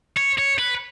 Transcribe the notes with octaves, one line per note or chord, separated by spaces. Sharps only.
C#5
C#5
B4